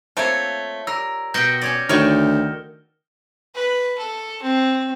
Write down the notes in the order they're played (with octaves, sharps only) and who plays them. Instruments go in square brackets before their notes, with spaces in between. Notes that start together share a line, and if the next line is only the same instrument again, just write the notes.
[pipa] A3 A#3 C4 [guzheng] F4 C#5
[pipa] G3 [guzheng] A#4 [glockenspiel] E6
[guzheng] B2 F#4 G5 [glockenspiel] G6 A#6 C#7
[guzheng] C#4 C#5 D5
[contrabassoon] D2 [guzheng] D#3 D5 [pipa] C#5 F#5 C#6 [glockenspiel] F6 G7
[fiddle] B4
A4
C4